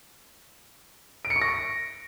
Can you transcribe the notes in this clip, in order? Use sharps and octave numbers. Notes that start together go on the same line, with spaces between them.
D7
C#7
C#6
A#6